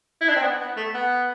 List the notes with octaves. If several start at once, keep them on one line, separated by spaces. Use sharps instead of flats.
E4
D4
C4
B3
B3
A3
B3